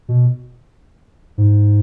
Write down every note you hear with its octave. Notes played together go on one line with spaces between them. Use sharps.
B2
G#2